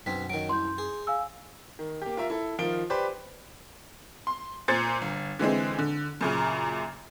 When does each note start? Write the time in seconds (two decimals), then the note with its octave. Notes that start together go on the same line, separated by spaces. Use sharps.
0.06 B1 F#2 C4 B6
0.30 D#3 F#3 D7
0.49 C2 C6 G6
0.78 G#4
1.07 F5 G#5 E6
1.79 D#3
2.02 A#3 G4
2.17 F4 A#4 E5
2.30 E4 A4
2.58 D#3 F3 F4 D7 G7
2.90 G4 B4 C5 D5
4.27 C6
4.68 A#2 C5 G#6 A6 C#7
5.01 G1
5.39 D3 E3 G#3 C4
5.79 D3
6.21 F#2 A#2 C#3